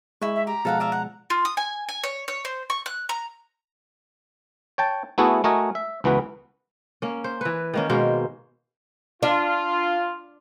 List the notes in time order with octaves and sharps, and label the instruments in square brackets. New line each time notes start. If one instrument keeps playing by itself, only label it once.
[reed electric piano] G#3 [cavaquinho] E4 C#6
[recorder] E5
[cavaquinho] G4 [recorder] A#5
[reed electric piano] B2 F3 G#3 [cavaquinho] A4 F5 F#5
[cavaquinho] D5 E5 F5
F#5
[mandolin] F4
D#6
G#5
G#5
C#5
C#5
C5
C#6
F#6
A#5
[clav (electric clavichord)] C#5 G5 A5
A3 B3 E4 F#4 G#4 A4
A3 F#4 A#4 D#5 G#5
E5
C#2 E3 B3 F#4 B4
[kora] A#3 C#4
C5
E3 B4
D#3 A#3 C#4
B2 G#3 A#3 C5
[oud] D4 [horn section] F4